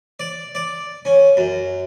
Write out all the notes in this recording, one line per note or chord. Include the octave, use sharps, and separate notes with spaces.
D5
D5
C#4
F#2